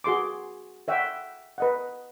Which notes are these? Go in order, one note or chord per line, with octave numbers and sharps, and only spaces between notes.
F#4 G#4 C6 D6
C#5 E5 F#5 G5
B4 D#5 F#5